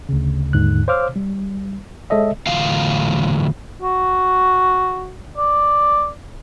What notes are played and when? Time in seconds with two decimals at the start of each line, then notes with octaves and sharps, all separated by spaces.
0.09 D2 C#3
0.53 D#2 G#2 D3 F#6
0.88 C5 C#5 F5 D6 E6 F6
1.16 G3
2.10 G#3 A4 C#5 D#5 E5
2.47 E2 A2 D3 F#3 F4 F5
3.82 F#4
5.37 D5